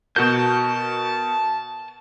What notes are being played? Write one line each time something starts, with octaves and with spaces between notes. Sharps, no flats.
B2 F#4 A#4 A5 G6